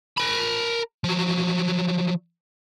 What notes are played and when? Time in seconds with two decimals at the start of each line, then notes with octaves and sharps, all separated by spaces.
0.17 A#4 B5
1.04 F3 F#3